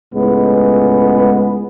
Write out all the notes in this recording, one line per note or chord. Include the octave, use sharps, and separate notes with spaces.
C#2 A2 G#3 B3